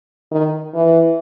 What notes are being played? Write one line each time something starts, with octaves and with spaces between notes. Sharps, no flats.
D#3
E3